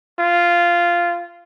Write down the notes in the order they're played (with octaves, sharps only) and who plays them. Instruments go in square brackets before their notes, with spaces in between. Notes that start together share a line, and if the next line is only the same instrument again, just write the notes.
[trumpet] F4